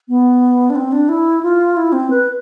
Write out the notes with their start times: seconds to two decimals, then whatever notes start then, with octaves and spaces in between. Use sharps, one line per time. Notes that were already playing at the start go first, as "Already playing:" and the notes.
0.08 B3
0.70 D4
0.75 C4
0.92 D4
1.09 E4
1.43 F4
1.77 E4
1.93 C4
2.10 B4